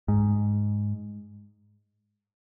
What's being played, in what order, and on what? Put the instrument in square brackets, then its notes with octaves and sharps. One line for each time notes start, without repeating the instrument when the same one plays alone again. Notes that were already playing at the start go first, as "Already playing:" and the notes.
[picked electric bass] G#2